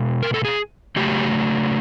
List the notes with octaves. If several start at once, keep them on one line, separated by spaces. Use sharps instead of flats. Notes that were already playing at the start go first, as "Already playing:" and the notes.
Already playing: B2 G#3
A#4
A4
G#4
C#3 F#3 A3 G4